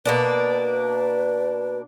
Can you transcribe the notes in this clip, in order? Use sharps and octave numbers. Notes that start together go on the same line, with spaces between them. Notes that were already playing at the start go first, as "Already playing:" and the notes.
B2 A#3 D4 B4